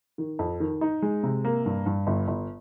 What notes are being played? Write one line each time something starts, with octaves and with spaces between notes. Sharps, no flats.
D#3
F2
D#3
D#4
G#3
C3
A#3
G2
G2
G1
G1